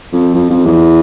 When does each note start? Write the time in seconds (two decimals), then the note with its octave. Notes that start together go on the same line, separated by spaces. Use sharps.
0.12 F2
0.34 F2
0.50 F2
0.66 E2